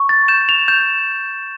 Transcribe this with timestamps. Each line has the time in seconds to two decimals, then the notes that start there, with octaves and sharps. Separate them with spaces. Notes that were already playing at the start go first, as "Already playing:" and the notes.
Already playing: C#6
0.09 A6
0.28 G6 E7
0.49 F7
0.68 G6 E7